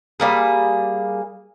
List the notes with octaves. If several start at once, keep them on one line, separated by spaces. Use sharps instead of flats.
G3 A#3 G#4